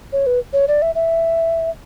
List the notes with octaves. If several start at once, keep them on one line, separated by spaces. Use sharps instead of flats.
C#5
B4
C#5
D5
E5
E5